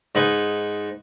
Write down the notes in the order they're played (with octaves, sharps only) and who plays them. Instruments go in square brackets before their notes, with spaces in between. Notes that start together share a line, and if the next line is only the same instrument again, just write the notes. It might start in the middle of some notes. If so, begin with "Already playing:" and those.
[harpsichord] G#2 D#4 B4 G#5